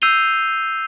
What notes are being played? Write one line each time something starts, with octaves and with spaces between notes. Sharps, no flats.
E6 G6 C7 D#7 F7 G7